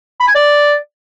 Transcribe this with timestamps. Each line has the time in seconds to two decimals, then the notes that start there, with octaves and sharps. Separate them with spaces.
0.20 B5
0.27 G#5
0.35 D5